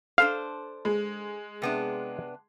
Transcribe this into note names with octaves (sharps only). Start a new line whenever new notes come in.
D4 A4 C5 F5
G#3
C3 B3 D4